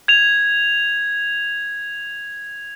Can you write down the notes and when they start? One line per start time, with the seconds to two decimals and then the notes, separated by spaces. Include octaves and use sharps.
0.08 G#6 F7